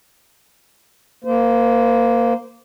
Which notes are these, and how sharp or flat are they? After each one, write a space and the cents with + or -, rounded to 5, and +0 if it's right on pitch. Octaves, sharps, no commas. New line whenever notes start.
A#3 -5 C5 -30